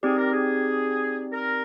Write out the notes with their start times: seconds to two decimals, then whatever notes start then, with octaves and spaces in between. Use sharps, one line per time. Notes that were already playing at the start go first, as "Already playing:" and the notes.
0.03 C4 D#4 G4 G#4 D5
0.17 A#4
0.31 G#4
1.32 A#4